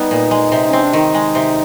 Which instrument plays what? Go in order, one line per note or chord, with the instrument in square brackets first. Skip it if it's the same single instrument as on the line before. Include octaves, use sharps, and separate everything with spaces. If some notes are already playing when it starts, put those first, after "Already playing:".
Already playing: [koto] G3 B3 [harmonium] D#4
[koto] A#2
G#3
C3
[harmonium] C#4
[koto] C4
[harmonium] D4
[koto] D#3 [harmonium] D#4
[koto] G#3
C3